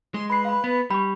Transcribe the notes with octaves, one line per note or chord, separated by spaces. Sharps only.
G#3 C6
B4 B5 C7
F5 B5
B3
G3 B5 C#6